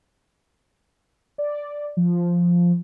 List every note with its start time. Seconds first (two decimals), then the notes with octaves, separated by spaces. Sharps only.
1.38 D5
1.97 F3